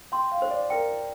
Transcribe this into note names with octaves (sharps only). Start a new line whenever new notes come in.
G5 C6
F5
C5
D5
A#4 G5